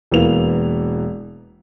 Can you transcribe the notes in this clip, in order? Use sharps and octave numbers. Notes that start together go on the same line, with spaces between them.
E1 E3 A#3 B3 F7